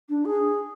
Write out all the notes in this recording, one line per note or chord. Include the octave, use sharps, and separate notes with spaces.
D4
G#4